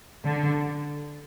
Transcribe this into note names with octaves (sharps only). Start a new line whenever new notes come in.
D3